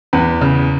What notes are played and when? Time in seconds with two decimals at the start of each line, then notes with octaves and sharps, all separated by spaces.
0.13 E2 B4
0.41 C#3